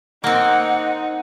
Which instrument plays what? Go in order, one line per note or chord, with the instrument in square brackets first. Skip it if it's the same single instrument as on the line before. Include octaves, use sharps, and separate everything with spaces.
[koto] A#3 C4 [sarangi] D#4 [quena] F#5